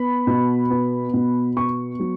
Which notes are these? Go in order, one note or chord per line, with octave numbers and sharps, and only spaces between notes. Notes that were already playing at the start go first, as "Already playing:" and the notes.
Already playing: B3 B5
B2
B3
B2
B3 C#6
F#3